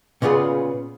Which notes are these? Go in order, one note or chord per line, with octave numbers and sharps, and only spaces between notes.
A#2 C#3 B3 F4 G#4